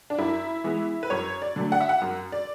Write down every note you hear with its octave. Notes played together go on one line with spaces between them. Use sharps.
D4
F#2 E4
E3 G#3 B3
B4
F#2 C#5
D5
D3 F#3 A3
F#5
E5
F#5
F#2
D5